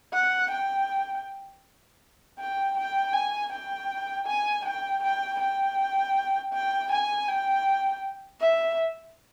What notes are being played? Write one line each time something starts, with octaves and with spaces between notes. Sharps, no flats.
F#5
G5
G5
G5
G#5
G5
G#5
G5
G5
G5
G5
G#5
G5
E5